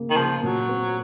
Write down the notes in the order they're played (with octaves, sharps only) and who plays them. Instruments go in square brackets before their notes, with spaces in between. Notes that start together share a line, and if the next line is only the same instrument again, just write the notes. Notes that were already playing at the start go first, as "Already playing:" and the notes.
Already playing: [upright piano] C#3 A#3
[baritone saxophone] D#3
[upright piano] C#3 [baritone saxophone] F3
[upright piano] A#2 [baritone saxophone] F#3
[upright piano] C4